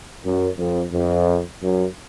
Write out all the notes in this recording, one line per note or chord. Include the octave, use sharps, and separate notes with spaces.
F#2
F2
F2
F#2